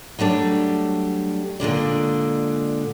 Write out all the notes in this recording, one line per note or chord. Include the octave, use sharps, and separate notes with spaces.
F#3 G3 A3 D4
A#2 D3 G#3 D5